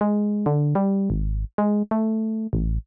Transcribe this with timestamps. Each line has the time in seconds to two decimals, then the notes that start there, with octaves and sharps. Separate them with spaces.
0.01 G#3
0.46 D3
0.75 G3
1.10 G#1
1.58 G#3
1.91 A3
2.53 A1